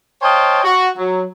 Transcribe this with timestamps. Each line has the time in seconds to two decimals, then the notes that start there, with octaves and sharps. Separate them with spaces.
0.22 C5 C#5 D#5 F5 G5 A5
0.64 F#4
0.98 F#3